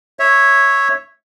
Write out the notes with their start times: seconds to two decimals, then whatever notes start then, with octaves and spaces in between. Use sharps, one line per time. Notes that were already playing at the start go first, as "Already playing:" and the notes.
0.19 C#5 E5